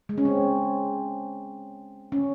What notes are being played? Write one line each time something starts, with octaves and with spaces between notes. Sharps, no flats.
G#3
C#4
C4
C#4